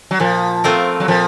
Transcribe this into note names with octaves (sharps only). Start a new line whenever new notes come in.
F#3
A#2 F3
A3 C4 F4 A#4
F#3
A#2 F3